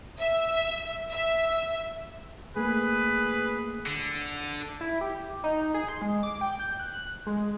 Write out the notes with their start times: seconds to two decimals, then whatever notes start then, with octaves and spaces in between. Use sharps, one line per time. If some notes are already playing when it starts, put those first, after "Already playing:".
0.20 E5
1.11 E5
2.57 A3 A#3 G#4 B4
3.86 D3
4.81 E4
5.01 G4
5.44 D#4
5.74 G#4
5.88 C6
6.02 G#3
6.23 D6
6.41 G5
6.59 G6
6.80 F#6
7.26 G#3